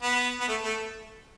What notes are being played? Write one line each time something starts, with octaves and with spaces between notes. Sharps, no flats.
B3
B3
A3
A3